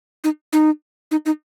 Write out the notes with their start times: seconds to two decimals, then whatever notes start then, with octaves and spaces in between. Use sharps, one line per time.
0.24 D#4
0.53 D#4
1.11 D#4
1.26 D#4